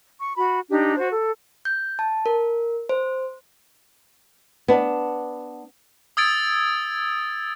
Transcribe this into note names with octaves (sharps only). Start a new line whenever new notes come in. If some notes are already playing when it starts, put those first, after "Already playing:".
C#6
F#4 B5
D4 D#4 G4
F#4 C5
A4
G6
A5
A#4
C5
B3 D4
D#6 E6 G#6 A6 D7